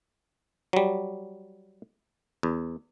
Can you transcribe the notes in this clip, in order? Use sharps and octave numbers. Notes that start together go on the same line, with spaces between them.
F#3 G3
E2